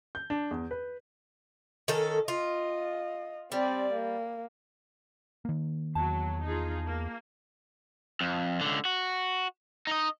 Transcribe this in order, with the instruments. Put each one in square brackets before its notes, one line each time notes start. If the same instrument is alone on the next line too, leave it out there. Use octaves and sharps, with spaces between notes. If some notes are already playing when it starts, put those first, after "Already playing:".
[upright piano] G6
D4
E2
B4
[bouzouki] D#3 C#4 A4
[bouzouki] F4 [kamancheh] D#5
[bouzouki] G3 [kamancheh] C4 D5
[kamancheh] A#3
[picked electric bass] D#3 A#3
[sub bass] E2 [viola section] F#3 [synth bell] A5
[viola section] D#4 F4 G#4
A#3
[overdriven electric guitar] F2
C#2 D3
F#4
D#4 D#5